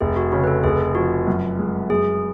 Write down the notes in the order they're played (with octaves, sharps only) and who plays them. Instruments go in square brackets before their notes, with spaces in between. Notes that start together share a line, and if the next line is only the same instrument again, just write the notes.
[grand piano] F1 [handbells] G#4
[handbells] F#4
[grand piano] C#3 [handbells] F#4
[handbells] B4
A4
[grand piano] F1 [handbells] G#4
[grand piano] F3 [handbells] F#4
[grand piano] F#2
G#3
[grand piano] F#2 [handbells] G#4